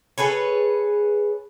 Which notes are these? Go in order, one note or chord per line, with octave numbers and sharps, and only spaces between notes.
G#4 A4 B4 C#5